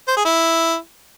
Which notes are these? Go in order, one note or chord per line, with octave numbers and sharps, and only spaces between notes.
C5
G#4
E4